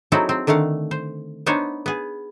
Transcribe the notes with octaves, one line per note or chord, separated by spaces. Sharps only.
F#3 C4 D#4 E4 G#4 A4
C4
D3 D#3 A3 F5 F#5
C5
B3 D4 D#4 C5 C#5
B3 G#4